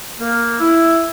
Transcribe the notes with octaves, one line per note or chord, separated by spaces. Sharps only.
A#3
E4